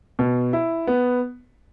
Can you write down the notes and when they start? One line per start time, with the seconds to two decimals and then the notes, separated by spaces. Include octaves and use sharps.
0.19 B2
0.53 E4
0.87 B3